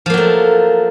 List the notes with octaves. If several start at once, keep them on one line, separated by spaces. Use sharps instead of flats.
F3 F#3 A3 A#3